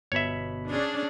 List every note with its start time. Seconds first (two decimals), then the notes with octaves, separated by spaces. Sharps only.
0.12 G1 B2 C#5 E5 B5
0.69 C#4 D4 G#4